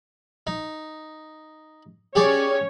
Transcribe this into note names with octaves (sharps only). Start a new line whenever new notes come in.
D#4
C#4 G4 G#4 C#5 D5